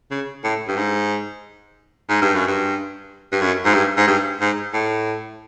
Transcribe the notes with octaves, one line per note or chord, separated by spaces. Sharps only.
C#3
A2
G2
G#2
G#2
G2
F#2
G2
G2
F#2
G#2
G2
G#2
G2
G#2
A2